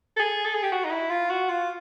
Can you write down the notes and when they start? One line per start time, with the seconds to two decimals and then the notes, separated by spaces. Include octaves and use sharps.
0.16 A4
0.19 G#4
0.45 A4
0.54 G#4
0.63 G4
0.72 F#4
0.84 D#4
0.91 E4
1.10 F4
1.30 F#4
1.49 F4